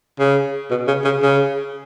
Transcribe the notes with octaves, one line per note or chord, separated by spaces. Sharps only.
C#3
B2
C#3
C#3
C#3